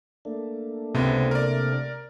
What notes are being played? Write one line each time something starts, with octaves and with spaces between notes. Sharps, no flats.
A3 A#3 D4
C#2 C3 B3
A#4 D5